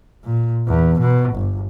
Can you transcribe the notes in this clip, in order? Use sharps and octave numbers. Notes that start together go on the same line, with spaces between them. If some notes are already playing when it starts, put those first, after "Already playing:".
A#2
E2
B2
G1